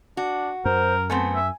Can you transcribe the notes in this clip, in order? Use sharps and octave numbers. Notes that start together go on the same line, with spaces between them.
D4 F#4
F#2 A#4 C5
A3 B3 C4 G#5
E5